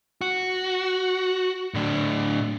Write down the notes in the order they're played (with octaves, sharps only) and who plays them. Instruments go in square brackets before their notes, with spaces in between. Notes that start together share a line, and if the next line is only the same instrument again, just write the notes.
[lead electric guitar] F#4
A2 D3